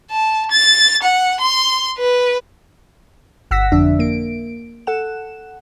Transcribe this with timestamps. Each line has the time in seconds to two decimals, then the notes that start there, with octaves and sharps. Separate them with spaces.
0.11 A5
0.51 A6
1.03 F#5
1.40 C6
1.98 B4
3.51 G1 F#5 E6 A#6 B6
3.72 F2 D3 D4 E5
3.99 A#3 D7
4.87 A4 F#5 E7